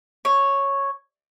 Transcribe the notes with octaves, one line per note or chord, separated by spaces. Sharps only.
C#5